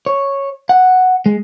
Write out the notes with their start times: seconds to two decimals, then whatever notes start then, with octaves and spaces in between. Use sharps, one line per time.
0.06 C#5
0.69 F#5
1.26 G#3